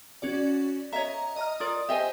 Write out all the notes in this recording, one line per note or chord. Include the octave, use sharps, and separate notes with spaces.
C#4 F#4 D5
C#5 D#5 E5 A#5
D#5 A#5 F6
F4 A#4 D5 D#6
G4 C5 D#5 E5 G#5